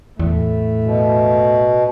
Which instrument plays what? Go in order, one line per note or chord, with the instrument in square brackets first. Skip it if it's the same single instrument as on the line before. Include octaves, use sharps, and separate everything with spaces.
[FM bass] E2 [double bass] A2 A3
[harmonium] B2